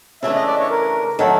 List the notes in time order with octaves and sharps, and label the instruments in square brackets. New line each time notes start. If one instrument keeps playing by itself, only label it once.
[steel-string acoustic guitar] C#3 E3 A3 D4 [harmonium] E5
[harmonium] D#5
D5
C#5
A#4
[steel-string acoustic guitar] D#3 F#3 A3 [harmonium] A4